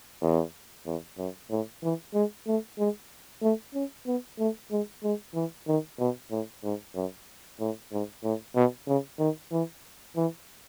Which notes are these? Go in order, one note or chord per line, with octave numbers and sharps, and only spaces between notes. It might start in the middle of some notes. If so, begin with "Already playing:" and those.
E2
E2
F#2
A2
E3
G#3
A3
G#3
A3
C#4
B3
A3
G#3
G#3
E3
D#3
B2
A2
G#2
F#2
A2
G#2
A2
B2
C#3
D#3
E3
E3